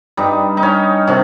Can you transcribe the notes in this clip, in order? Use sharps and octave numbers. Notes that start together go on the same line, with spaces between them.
G2 G3 D#4
D#4
C#4
C3 D#3 C#4